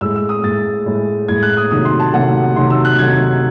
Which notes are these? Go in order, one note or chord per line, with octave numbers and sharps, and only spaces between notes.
A2 G#3 E6
E6
D#6
A2 G#3 A6
A2 G#3
A2 G#3 G#6
F#6
D#6
C3 D#3 F#3 A3 D#6
C6
A5
C3 D#3 F#3 A3 F#5
C3 D#3 F#3 A3 C6
E6
F#6
C3 D#3 F#3 A3 G#6